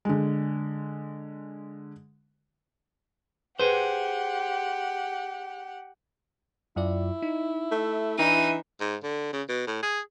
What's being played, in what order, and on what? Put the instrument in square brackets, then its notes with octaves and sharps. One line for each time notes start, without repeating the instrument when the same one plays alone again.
[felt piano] D3 G#3
[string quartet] G4 F#5 [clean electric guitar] G#4 C5 [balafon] B4
[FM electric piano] F#2 F4 D5 [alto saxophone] E4
[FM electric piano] D#4
[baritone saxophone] A3
[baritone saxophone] E3 [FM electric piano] D4 [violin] D#4 D#7
[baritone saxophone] G#2
D3
C#3
B2
A2
G#4